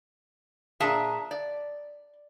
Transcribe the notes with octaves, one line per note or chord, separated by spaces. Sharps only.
A#2 D4 G#4 E5 A5 A#5
D5